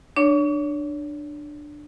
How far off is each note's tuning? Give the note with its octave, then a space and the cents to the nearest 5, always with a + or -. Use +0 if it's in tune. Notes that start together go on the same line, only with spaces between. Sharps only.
D4 +15 C#5 +30 C#6 +40